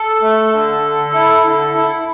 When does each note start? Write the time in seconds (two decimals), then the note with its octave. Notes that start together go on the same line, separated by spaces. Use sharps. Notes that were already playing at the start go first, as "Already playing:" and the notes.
Already playing: A4
0.22 A3
0.52 D3
0.82 D3
1.13 E4
1.44 D3
1.74 E4